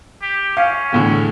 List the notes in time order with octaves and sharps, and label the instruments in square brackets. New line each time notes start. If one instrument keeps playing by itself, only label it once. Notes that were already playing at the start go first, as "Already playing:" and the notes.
[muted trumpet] G4
[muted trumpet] C#4 [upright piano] F5
[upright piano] E2 A2 D3